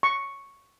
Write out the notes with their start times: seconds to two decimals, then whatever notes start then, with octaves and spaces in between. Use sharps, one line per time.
0.03 C#6